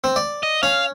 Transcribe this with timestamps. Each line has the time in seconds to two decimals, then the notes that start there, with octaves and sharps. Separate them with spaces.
0.04 C4
0.16 D5
0.43 D#5
0.63 C#4 F5